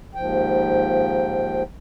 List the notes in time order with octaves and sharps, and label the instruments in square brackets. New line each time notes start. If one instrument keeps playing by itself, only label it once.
[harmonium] D#2 G#2 F3 G5